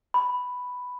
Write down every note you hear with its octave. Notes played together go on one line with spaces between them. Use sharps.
B5